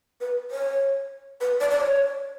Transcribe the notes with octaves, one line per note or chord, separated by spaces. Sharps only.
B4
C#5
B4
D5
D5
C#5